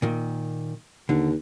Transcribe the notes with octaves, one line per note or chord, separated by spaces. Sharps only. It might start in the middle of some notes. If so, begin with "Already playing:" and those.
A#2 D#3
D#2 D3